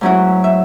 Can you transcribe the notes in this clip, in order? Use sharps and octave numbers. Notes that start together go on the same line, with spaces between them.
G#2 F#3 A3 C#4 E4 F#4
E5